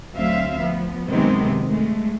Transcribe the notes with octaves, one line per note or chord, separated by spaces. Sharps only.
D2 F#3 C4 E5 F5
F3 B3
F#2 C3 D#3 G#3 B3 C4
G#3 A3